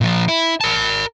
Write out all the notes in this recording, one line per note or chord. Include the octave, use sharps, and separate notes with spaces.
A#2 F3
E4
A#4 A5